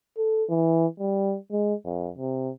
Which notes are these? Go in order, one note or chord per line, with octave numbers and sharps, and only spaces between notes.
A4
E3
G3
G#3
F2
C3